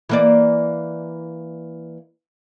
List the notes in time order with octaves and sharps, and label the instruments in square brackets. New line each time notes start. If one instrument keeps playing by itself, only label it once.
[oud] E3 A#3 D5